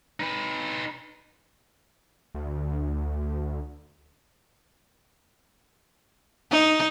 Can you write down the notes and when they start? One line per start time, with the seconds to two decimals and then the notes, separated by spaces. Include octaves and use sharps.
0.20 D#4 B4
2.35 D2
6.51 D#4